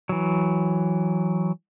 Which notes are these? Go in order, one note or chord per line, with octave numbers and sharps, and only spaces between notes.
E3 F#3